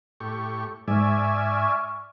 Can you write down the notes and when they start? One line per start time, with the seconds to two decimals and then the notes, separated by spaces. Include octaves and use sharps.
0.20 A2 G4 C#6
0.88 G#2 D5 E5 G#5 C#6 F6